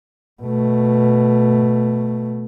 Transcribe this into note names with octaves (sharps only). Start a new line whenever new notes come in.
B2 A3